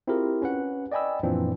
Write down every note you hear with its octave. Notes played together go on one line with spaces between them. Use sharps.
C4 E4 F4 G4 G#4 A#4
C#4 B4 F#5
D5 D#5 G5 G#5 B5 E6
F#2 A#2 E3 F3 C4 D4